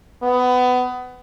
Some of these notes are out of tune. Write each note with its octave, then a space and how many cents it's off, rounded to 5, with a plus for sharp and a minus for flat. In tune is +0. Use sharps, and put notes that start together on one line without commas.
B3 +20